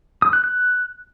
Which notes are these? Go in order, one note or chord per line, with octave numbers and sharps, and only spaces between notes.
D#6
F#6
F#6